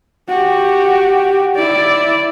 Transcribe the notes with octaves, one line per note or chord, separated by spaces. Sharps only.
F#4 G4
E4 D5